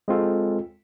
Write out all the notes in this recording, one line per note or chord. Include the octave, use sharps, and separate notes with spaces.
G#3 C4 F4 A4